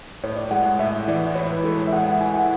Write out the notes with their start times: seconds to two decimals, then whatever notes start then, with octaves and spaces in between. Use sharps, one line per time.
0.23 A2 C#5
0.37 D5
0.51 G#3 F#5
0.65 F#5
0.79 A2 E5
1.08 E3 D5
1.35 E4 C#5
1.50 B4
1.64 G#3 A4
1.79 B4
1.87 E5
1.92 G#3 F#5
2.06 F#5
2.21 E4 G#5
2.34 F#5